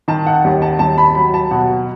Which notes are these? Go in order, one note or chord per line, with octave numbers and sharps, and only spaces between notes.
D#3 A5
F#5
D#2
A5
D#2 A5
B5
F#3 B5
A5
B2 F#5